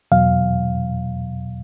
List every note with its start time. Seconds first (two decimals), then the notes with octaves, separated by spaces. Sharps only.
0.12 E2 B2 F#3 F5